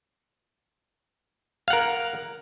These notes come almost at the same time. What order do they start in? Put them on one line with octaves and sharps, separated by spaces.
F5 F#5 A#4